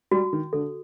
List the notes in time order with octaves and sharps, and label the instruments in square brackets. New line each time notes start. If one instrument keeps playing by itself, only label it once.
[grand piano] G3 [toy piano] F#4
[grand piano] D#3
[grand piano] D3 [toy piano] A4